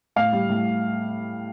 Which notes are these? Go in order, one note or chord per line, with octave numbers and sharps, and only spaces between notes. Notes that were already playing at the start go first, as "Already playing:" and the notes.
A2 F5
G3
A2